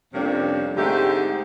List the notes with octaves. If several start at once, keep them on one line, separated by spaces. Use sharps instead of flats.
F2 C3 G3 A#3 C#4 D4
G#2 D3 A3 C4 G4